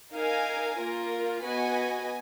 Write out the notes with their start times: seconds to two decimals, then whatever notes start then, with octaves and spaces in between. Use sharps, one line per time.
0.14 D#4 A#4 F5 G#5
0.79 A#3 F4 A#4
1.44 B3 F#4 B4 D#5 G#5